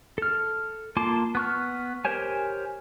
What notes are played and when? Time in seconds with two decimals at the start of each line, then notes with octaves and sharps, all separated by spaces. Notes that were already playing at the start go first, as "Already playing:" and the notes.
0.18 A4 F6
0.97 A#3 F4 A5 C6 D6
1.35 B3 C#6 F6
2.05 G4 A#4 C5 C#5 G#5